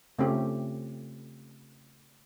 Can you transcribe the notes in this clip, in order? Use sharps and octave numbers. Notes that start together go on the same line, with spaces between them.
C#3 A3 C4 C#4 F4 G4